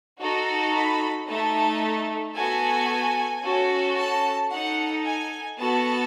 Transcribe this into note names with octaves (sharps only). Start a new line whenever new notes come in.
D#4 F#4 A4
B5
A3 D#4 A4 A5
B3 F#4 A4 G#5
C#4 F#4 A4
A5
D#4 A4 F#5
G#5
B3 F#4 A4 A5